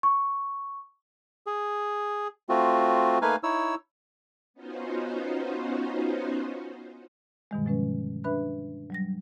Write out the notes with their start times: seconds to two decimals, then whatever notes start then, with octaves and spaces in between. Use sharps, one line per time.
0.03 C#6
1.47 G#4
2.49 A3 C4 F4 F#4
3.22 A3 A#3 D#4 B4 F5 G#5
3.43 D#4 E4 C#5 E6
4.54 B3 C#4 D#4 F4 F#4 C5
7.51 G2 B2 D3 D#3 G3 G#3
7.65 B2 F3 G#3 C#4 B4
8.24 D4 B4 E5 B5 F#6
8.90 F#3 G3 A#6